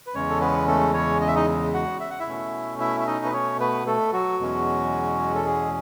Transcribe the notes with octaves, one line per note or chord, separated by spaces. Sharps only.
B4
E2 C#3 G#3 C#4 C#5
A4
B3 B4
A3 A4
C#4 C#5
D#5
E5
D#4 D#5
F#4 F#5
E5
F#5
E4 E5
B2 A3 C#4
E4 E5
E5
D#4 D#5
B4
C#4 C#5
B3 B4
A3 A4
F#3 F#4
E2 B2 G#3 C#4
A4
G#3 G#4